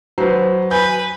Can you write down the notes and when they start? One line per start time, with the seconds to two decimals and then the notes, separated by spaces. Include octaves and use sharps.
0.18 F#3 B4 C5
0.71 B4 G#5 G6